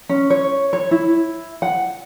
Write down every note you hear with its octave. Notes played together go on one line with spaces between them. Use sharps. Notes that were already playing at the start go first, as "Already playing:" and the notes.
C#4
C#5
C#5
E4
F#5